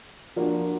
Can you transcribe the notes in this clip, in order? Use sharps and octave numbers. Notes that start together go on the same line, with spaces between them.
F3 A#3 D4 F#4